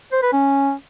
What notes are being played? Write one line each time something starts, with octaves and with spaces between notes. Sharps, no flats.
C5
B4
C#4